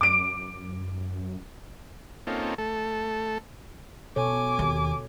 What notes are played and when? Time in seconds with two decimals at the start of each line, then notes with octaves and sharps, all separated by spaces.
0.01 F#2 D6 D7
2.27 A#3 C4 C#4 D#4 F4 A4
2.58 A3 A4
4.16 B2 A4 C#5 G#5 D6
4.59 D#2